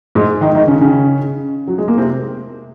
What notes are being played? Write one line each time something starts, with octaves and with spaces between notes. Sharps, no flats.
G#2 G#3
D#3 D#4
D#3 D#4
C#3 C#4
C#3 C#4
F#3
G#3
A#3
C3 C4